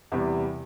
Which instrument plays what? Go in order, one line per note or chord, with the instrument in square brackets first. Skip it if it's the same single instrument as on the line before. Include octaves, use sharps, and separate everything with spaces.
[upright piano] E2 C3 G3